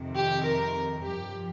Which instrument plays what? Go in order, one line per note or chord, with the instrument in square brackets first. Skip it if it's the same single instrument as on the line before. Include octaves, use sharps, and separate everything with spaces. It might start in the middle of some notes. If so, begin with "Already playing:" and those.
Already playing: [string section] F2 C3 D#3
G4
A#4
G2 F3 G4